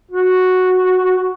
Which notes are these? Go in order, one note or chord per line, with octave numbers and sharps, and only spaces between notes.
F#4